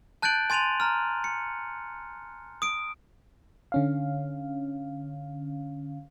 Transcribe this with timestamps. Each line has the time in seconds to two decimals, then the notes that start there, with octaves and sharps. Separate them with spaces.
0.22 A5 F#6 G6 A6 D7 F#7
0.50 G#5 C6 A6 D#7 F7 F#7
0.80 A#5 F6
1.24 C#7
2.62 D#6 D7
3.72 D3 C#4 F5